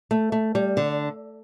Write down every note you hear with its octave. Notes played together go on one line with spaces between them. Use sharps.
A3
A3
G3
D3